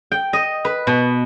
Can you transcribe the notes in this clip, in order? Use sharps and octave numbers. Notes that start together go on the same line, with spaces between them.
G5
D#5
B4
B2